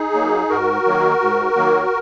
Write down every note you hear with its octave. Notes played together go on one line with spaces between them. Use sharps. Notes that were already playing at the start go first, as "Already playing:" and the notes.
Already playing: D#4 G#4
F#3 A#3
G#2 F#4 A#4
D#3 F#3 A#3
G#2
D#3 F#3 A#3